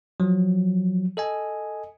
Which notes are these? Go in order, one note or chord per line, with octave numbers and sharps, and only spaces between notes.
F3 F#3
A4 D#5 G#5